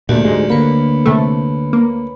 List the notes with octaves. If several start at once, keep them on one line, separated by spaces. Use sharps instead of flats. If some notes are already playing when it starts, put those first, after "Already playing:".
D2 A#2 A3 F#4 G4 D5
G#2 G#3
D3 A#3 B4 C#5 B5
C3 A3
A#3